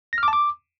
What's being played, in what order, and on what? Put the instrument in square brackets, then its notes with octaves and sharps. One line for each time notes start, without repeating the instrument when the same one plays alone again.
[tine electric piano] A#6
F6
D6
A5
D6